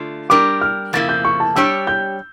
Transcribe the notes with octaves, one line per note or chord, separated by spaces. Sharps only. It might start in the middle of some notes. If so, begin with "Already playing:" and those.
Already playing: D3 A3 D4 F4
G3 D4 G4 A#4 D6
F6
F2 C#3 F3 A#3 E4 A6
G6
C#6
A5
G3 D4 G4 C#5 E6
G6